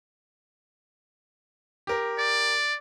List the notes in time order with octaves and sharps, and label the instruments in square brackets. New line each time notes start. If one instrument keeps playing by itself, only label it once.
[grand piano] G4 A#4
[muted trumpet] D5